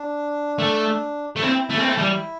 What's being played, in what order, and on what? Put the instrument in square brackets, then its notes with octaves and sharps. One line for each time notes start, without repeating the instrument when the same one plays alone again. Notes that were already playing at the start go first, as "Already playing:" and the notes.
Already playing: [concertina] D4
[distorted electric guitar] A3
A3
[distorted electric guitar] C4 [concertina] E4
[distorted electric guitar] A3
C4
A3
G3